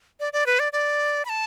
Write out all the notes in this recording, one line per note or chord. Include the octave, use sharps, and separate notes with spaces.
D5
D5
B4
D5
D5
B5
A5